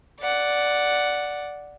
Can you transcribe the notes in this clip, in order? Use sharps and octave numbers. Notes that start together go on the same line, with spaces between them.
D5 F#5